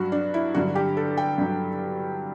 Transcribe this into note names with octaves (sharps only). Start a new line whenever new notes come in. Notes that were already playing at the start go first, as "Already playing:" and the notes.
Already playing: G2 F#3 F#4
D4
E4
G2 D3 F#3 F#4
G4
A4
G5
G2 D3 F#3